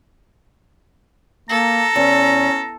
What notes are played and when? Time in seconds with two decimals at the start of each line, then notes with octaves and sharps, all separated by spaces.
1.49 A#3 A4 A#5
1.96 E2 C#4